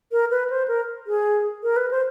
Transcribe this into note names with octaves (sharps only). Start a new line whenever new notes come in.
A#4
B4
C5
A#4
G#4
A#4
B4
C5